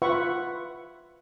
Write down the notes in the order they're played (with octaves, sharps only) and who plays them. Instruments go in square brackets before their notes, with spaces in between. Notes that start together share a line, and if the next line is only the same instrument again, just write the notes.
[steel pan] F4 B4 E5 F#5 C#6